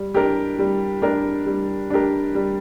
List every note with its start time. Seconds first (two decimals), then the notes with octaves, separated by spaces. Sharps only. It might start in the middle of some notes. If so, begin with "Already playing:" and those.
Already playing: G3
0.14 D4 G4 A#4
0.59 G3
1.02 D4 G4 A#4
1.46 G3
1.90 D4 G4 A#4
2.35 G3